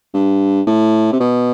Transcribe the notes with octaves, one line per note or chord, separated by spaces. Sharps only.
G2
A2
C3
B2